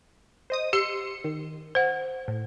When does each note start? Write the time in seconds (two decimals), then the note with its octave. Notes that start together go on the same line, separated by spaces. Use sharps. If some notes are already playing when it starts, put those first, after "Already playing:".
0.50 C5 D#5 D#6
0.73 G4 C6 C#7
1.24 D#3
1.75 C5 F#5
2.28 A2